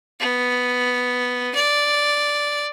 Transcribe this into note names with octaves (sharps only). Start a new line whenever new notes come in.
B3
D5